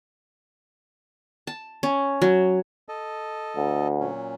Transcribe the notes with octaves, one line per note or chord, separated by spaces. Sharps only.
A5
C#4
F#3
A4 D#5
D2
A#2 F#3 C#4